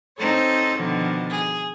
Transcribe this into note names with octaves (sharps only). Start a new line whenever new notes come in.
C4 D#4 A4 C5 C#5
B2 D3 D#3 F3
G#4